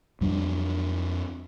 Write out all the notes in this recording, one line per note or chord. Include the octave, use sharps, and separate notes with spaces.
F2 G3 D4